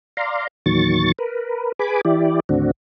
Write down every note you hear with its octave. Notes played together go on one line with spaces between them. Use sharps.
D5 F5 A#5 C6
E2 A#2 D#3 F#3 C#6 A6
A#4 B4
G#4 B4 G#5 B5 D6
E3 E4 G4 D5
D#2 A2 D3 C4 D4 F#4